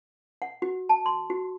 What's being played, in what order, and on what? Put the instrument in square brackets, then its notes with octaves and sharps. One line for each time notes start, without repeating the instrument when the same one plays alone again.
[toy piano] F#5
F#4
A5
C6
F#4